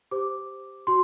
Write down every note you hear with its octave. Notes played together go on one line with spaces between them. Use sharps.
G4 C5 D6
F#4 C6